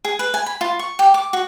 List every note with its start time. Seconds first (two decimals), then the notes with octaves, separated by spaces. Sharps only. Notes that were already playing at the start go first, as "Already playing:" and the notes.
0.05 G#4
0.19 B4
0.34 G#5
0.46 B5
0.61 F4
0.79 C#6
0.99 G4
1.14 D6
1.33 F#4